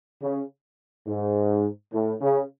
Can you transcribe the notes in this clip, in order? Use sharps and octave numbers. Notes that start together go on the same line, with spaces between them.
C#3
G#2
A2
C#3